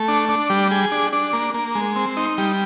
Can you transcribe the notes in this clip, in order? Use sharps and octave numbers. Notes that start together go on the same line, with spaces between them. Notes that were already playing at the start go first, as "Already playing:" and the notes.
Already playing: A3
D4
D4
G3
G#4
D4
D4
A#3
A#3
G#3
C4
D#4
G3